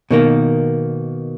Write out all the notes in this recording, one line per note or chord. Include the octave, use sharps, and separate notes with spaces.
B2 D#3 A#3